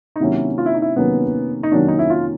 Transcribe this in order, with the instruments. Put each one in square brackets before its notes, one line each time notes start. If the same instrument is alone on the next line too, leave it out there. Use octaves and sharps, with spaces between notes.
[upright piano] D#4
[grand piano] C3 D#3 F#3 A#3 C#4 [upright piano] E4
[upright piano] F4
E4
D#4
E4
[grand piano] C3 D#3 F#3 A#3 C#4 [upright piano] B3
[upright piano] D#4
[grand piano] C3 D#3 F#3 A#3 C#4 [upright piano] D4
[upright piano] D#4
E4
F4